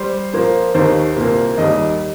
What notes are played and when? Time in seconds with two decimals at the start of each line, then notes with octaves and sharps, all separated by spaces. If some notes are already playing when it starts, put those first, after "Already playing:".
Already playing: G3 C5
0.33 A#2 F3 A#3
0.74 D#2 D#3 A#3 C5
1.16 C2 A#2 A#3
1.58 D#2 D#3 G3 D#5